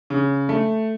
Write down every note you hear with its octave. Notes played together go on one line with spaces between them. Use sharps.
C#3
A3